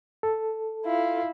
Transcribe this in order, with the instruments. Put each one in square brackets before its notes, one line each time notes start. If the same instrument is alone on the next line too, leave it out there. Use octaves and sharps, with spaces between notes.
[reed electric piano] A4
[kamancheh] E4 F4